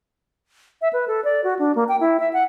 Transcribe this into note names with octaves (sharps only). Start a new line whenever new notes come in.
E5
B4
A4
D5
F#4
D4
A#3
G5
E4
E5
F#5